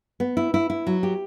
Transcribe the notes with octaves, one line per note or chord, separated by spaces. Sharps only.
B3
E4
E4
E4
F#3
G4